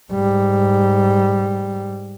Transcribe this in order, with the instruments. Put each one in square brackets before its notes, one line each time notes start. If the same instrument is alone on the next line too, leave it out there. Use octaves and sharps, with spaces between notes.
[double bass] G#2 G3